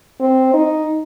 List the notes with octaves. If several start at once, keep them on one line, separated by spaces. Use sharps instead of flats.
C4
D#4